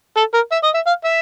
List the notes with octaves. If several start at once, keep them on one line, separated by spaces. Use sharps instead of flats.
A4
A#4
E5
D#5
E5
F5
E5